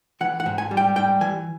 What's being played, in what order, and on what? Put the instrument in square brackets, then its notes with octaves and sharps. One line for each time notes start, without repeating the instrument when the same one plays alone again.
[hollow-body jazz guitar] E3 F#5
F#5
G#2
G#5
G3
G5
G#2 G5
E3 G#5